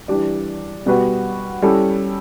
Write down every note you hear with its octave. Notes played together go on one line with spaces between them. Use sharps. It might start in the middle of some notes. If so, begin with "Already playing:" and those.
E3 G3 D4 G4 D5
B2 G3 B3 F#4 B4
G3 C#4 E4 A4